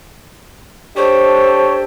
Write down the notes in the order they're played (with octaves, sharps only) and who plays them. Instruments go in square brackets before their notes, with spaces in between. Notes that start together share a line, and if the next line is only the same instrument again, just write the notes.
[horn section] D4 G4 A4 [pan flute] C5 [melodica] C#5